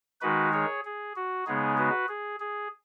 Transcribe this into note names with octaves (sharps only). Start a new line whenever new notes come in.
D#3 G#3 D#4 F#4 B4
G#4 C#5
G#4
F#4
C#3 G#3 B3 D#4 G#4
F#4 B4
G#4
G#4